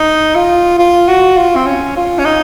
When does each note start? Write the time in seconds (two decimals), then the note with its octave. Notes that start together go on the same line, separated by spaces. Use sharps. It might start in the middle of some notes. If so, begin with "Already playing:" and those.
Already playing: D#4
0.35 F4
0.79 F4
1.08 F#4
1.37 F4
1.56 C4
1.66 C#4
1.96 F4
2.18 C#4
2.25 D#4